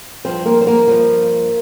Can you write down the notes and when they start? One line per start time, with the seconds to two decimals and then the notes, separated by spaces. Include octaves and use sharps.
0.25 G2 F3 C4 C5
0.45 A#3 A#4
0.61 C5
0.67 A#3 A#4
0.88 G2 F3